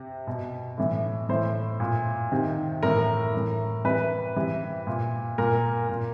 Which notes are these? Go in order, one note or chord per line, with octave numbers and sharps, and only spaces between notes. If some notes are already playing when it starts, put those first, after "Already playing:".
Already playing: C3
B2
A2 E3
A2 E3 C5
A#2
C3 D#3
A2 E3 A#4
A2 E3
C3 E3 B4
C3 E3
A#2
A#2 A#4
A#2